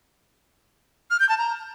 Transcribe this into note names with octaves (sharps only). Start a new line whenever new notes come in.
F6
G6
A5
A#5